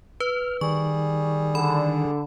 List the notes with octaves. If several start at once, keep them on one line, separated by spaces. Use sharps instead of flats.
B4 F6
D#3 G3 G#4 C#6
D3 B5